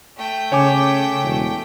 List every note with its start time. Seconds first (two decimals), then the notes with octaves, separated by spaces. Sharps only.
0.18 A3 G5
0.52 C#3 C#5 G#5 D6
1.23 E1